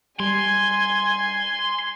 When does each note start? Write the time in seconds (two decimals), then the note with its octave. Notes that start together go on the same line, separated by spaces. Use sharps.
0.20 G3 G#5 C6 G#6